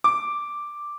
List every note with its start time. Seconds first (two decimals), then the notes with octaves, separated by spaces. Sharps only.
0.04 D6